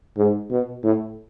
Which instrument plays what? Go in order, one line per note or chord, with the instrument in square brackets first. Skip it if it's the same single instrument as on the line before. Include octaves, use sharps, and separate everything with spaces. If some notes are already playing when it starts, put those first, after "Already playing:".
[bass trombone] G#2
B2
A2